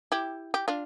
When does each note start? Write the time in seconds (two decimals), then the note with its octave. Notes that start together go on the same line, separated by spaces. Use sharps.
0.12 E4 G4
0.54 G4
0.68 D4 F4